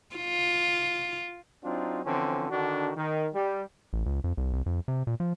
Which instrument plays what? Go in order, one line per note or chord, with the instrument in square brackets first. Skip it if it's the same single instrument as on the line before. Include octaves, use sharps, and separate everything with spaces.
[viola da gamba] F4
[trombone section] F#3 C4 D4 D#4 F4
D3 E3 F3 C4 C#4
D3 D#3 D4 F#4
D#3
G3
[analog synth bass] A1
C#2
F2
C2
C2
F2
C3
A#2
F3